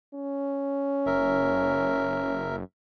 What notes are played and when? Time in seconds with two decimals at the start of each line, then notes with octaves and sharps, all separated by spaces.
0.14 C#4
1.06 F#1 A#4 E5